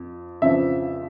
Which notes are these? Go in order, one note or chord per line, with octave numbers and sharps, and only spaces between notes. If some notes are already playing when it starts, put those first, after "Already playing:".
Already playing: F2
F2 C#3 F3 E5